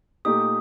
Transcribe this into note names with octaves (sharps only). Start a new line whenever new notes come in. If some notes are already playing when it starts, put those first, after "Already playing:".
A#2 A3 D#4 G4 D#6